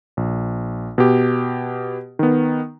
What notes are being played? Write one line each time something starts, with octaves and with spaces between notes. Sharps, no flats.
A#1
B2 G4
D#3 B3